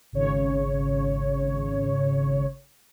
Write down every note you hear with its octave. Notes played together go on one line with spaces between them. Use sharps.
G#1 C#3 C#5